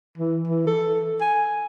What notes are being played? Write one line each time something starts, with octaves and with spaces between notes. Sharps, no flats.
E3
E3
A4
G#5